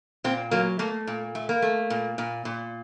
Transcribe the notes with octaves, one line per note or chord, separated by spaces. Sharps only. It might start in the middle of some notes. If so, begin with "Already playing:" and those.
A#2 C4
F#3 A#3
A3 A#3
A#2
A3
A#3
A3
A#2
A#2
A#2